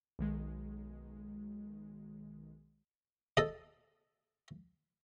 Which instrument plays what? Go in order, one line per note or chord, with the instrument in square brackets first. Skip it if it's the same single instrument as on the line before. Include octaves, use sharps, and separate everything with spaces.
[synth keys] B1 D#3 G#3
[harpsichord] A4 D#5